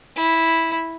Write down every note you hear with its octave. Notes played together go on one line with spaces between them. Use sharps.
E4